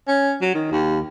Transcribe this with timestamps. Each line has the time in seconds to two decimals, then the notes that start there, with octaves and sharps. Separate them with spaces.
0.08 C#4
0.41 F#3
0.54 D#3
0.72 D#2